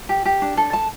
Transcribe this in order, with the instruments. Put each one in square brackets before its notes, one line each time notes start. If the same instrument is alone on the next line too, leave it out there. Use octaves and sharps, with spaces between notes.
[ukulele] G4
G4
D4
A4
A5